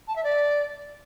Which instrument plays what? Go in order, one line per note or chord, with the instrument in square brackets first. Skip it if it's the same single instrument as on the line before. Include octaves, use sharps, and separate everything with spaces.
[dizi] A5
E5
D5